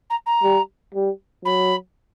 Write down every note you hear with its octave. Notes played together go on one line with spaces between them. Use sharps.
A#5
A#5
G3
G3
F#3 B5